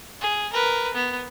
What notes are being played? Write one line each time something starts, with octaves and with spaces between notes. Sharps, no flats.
G#4
A#4 B4
B3